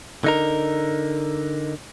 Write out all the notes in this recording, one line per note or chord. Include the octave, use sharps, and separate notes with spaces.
D3 D#4 A#4